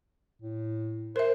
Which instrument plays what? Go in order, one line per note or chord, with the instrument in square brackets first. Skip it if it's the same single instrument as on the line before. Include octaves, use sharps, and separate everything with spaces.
[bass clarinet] A2
[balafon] A#4 E5 [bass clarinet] C5